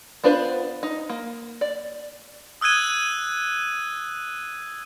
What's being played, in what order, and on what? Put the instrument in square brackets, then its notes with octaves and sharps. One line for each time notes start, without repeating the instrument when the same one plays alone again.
[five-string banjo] B3 D4 F4 B4 C5
D#4
A#3
D5
[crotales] D#6 E6 F#6 G#6 D#7